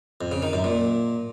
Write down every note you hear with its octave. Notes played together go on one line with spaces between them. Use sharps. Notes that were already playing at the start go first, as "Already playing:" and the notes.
F2
C#3
D#3
F#2
A#2